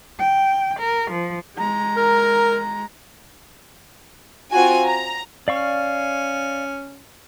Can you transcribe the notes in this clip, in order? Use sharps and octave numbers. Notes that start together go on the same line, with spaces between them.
G5
A#4
F3
G#3 A#5
A#4
C4 F4 F#4 G#5
A#5
C#4 D5 F5 C#6